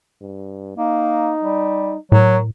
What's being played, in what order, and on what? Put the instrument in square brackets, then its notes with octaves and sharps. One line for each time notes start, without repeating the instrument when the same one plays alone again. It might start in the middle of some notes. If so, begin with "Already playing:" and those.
[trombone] G2
[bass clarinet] A#3 [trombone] D#4
[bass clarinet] G3
[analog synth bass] A2 [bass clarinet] F#3 [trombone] A#4